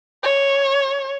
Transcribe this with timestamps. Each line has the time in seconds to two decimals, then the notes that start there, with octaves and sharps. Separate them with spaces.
0.23 C#5